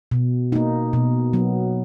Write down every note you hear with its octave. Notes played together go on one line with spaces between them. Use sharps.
B2
A#3 D#4
B2
F#3 B3